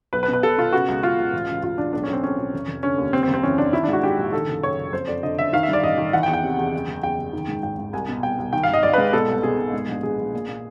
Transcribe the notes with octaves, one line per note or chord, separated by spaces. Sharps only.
B1 B4
B4
B2
B4
B2 A4
B2 F4
C#3 F#4
C#2
C#2 F4
C#2
A1
A1
A1 F4
A1 D4
B1 D4
C#4
B1
C4
B1 C#4
B1
F1
F1
D3 C#4
D#2
C3 C4
C4
F#1
C4
E3 C#4
F#1 D4
D#3 E4
D4
G#2 F#4
G#2 G4
A#1
D#3 A4
F#1
F#1 C#5
F#1
F2 C5
F2 D5
D3 D#5
F#1 E5
D#3 F5
E5
G2
D5
A1 D#5
D#3
E3 F#5
G5
E2
G5
C3
E2
F#1
F#1
E2 G5
F#1
D#3
G#2
G#1 G5
G#1
C2 G#5
B2
C2 G5
C2
D#3 G5
F5
G#1 D#5
G#1 D5
B4
G#2
B2 A4
C2
B2 G#4
B2
G#2
A#1
A#1 G#4
A#1
A#2
A#2